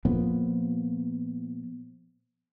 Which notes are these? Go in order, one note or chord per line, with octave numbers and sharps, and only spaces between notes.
A#2 F3 A#3 B3